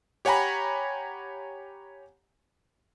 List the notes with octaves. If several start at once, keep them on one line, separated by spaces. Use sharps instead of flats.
G4 C#5 F#5 G#5 A#5 B5